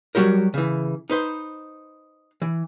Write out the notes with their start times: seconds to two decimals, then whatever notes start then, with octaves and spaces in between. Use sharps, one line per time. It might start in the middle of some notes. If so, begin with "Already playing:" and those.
0.15 F#3 G3 F#4 G4 A#4
0.54 C#3 E3
1.10 D#4 B4 C5
2.42 E3